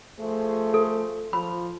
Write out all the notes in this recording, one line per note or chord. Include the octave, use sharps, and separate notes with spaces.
F3 A3 G#4 C5
A4
F3 B5